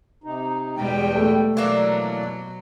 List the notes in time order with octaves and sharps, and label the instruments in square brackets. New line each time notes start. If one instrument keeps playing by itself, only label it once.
[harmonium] C3 D#4
[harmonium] E2 G5 [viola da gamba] B2 G3 G#3
[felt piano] A3
[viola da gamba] B2 F#3 [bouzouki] E3 A#3 D4 [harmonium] D5